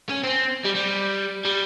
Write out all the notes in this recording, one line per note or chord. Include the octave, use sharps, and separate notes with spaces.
C#4
C4
G3
G3
G3